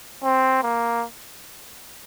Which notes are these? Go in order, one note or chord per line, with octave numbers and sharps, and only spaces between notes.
C4
A#3